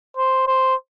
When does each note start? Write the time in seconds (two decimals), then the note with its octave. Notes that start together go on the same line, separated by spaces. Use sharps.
0.17 C5
0.47 C5